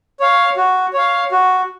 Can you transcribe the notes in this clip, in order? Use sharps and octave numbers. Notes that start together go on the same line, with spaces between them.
C#5 F5
F#4
C#5 F5
F#4